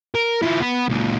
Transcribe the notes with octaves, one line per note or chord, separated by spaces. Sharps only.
A#4
F3 E4
B3 B4
C#2 A#2